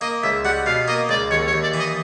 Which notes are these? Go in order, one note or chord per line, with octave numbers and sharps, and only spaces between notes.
A#3 D#5
C#2 E5
G3 F#5
B2 F5
A#3 D#5
C#2 D5
D#2 C#5
C#5
D#2
D5
E3
D#5